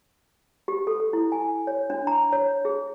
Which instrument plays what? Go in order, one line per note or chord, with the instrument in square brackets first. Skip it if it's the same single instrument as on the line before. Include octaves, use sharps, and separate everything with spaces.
[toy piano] G4
A4
A4
E4
G#5
C#5
D4
A#5
C#5
G#4